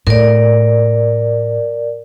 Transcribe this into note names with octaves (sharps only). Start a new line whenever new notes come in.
A2 A#4 D5